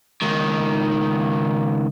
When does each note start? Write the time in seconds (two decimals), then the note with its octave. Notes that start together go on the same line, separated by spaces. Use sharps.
0.22 C#2 D#3